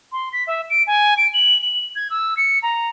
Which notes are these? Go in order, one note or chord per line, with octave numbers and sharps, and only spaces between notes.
C6
B6
E5
D7
G#5
D7
F#7
F#7
G#6
E6
C#7
A#5